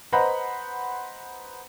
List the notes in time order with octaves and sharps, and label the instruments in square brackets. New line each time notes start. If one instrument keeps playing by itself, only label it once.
[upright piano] B4 C5 D#5 F#5 A#5 B5